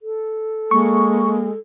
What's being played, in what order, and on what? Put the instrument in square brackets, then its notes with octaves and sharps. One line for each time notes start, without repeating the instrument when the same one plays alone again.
[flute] A4
[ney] G#3 [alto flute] A#3 [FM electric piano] C#6